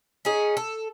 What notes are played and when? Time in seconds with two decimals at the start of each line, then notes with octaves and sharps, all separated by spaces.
0.25 C#4 D#4 G#4
0.57 A4